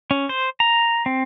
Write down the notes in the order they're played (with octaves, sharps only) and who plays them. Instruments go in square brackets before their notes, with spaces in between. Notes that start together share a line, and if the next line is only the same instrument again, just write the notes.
[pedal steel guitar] C#4
C5
A#5
C4